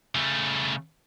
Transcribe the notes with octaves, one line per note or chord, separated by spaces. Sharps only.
C#3 A3